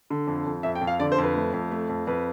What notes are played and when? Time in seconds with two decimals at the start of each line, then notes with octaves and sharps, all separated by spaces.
0.10 D3
0.27 F2
0.46 F2
0.63 F2 E5
0.75 G5
0.81 F2
0.87 F5
1.00 D3 D5
1.12 C5
1.18 F2 B4
1.36 A3
1.53 F2
1.71 A3
1.89 F2
2.07 F2 B4